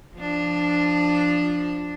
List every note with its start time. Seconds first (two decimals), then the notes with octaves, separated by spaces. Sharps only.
0.17 F3 D4